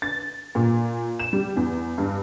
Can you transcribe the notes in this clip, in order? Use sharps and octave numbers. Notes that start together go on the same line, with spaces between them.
A6
A#2
E7
G3
E2
G2